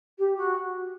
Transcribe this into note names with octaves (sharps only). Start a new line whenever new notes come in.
G4
F#4